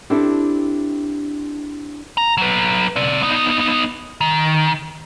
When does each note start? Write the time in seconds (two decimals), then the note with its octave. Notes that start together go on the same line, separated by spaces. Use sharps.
0.10 C4 D4 E4 G4 A4
2.17 A#5
2.38 F#3 B4
2.96 C4 D5
3.23 B3 D#4
4.21 D#3